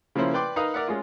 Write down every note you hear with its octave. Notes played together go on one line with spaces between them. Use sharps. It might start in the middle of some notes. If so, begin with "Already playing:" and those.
C#3 F3 A#3 C#4 E4 C5
B4 D5 G5 C6 D6
D#4 A#4 B4 F5 A#5 D#6
A#4 D5 E5 F#5
G#3 C#4 F4